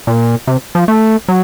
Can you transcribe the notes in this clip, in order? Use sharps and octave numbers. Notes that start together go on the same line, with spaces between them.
A#2
C3
F3
A3
F#3